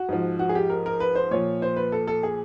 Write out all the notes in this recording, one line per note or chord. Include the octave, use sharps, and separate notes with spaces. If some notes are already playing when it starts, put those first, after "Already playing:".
Already playing: F#4
G#2 F3
F#4
G#4
G4
A#4
A#4
B4
C5
A#2 F3 C#5
C5
B4
A4
A4
G#4